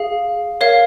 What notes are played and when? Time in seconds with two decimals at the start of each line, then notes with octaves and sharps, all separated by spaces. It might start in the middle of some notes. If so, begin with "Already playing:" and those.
Already playing: G#4 F5
0.61 A#4 C#5 F5